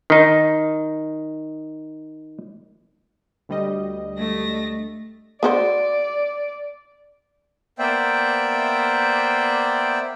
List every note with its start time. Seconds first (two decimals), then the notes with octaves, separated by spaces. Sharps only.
0.10 D#3 D#4
3.49 D2 G3 D#5
4.17 A3 A#6
5.43 B3 F#4 C5 D5
7.79 A#3 B3 C5 D5 E5 G5